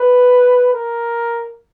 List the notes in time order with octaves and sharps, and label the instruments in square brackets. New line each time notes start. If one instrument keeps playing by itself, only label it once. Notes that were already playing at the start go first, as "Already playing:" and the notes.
Already playing: [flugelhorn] B4
A#4